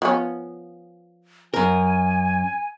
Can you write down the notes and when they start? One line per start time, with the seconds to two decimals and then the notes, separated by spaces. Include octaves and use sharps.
0.02 F3 B3 C#4
1.54 F#2 A#4 G#5